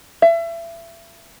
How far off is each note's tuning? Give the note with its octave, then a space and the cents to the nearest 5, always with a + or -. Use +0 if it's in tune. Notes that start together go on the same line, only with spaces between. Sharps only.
E5 +30